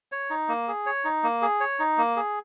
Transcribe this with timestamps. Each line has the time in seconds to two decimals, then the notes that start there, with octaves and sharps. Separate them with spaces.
0.12 C#5
0.30 D#4
0.49 A#3
0.68 G#4
0.86 C#5
1.05 D#4
1.23 A#3
1.42 G#4
1.60 C#5
1.79 D#4
1.98 A#3
2.16 G#4